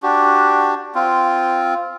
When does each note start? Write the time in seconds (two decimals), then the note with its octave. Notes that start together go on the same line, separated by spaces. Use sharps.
0.03 D4 F#4 G4
0.95 C4 F4